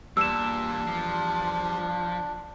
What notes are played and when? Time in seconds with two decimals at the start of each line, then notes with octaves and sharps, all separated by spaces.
0.17 E2 A#2 G3 D4 E6 E7
0.87 F3